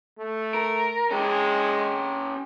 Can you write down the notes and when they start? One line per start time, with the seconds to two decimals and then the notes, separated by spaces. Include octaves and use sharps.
0.18 A3
0.54 A#4
1.11 G#3 C#4 G4